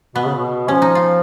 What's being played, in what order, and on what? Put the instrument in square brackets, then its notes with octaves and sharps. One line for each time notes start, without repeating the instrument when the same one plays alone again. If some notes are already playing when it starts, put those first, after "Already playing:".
[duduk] B2 [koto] B3
[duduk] C#3
B2
[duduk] F3 [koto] C#4
[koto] D#4
F4